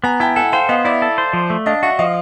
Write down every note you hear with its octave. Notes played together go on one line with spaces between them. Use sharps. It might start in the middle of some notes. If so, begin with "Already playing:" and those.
B3 G#5 A#5
E4 G5 A5
A4 F#5 G#5
C5 F5 G5
B3 D#5 F5
E4 D5 E5
A4
C5
F3
A3
D4 D#5 F5
F#4 E5 F#5
F3 D#5 F5